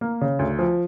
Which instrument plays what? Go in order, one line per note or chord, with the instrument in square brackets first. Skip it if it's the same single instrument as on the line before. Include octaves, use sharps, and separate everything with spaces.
[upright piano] A#3
C#3
D2
F3